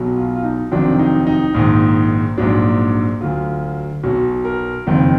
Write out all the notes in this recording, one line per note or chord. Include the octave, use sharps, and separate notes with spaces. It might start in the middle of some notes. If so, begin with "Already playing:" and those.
Already playing: B1 B2 F#3
F4
F4
D#4
F1 F2 D#3 F#3 D4
D#4
D#4
A#1 G#2 D#3
A#1 G#2 F#3 D4
D2 D3 F#3 F4
B1 B2 F#3 F#4
A#4
F#1 F2 D#3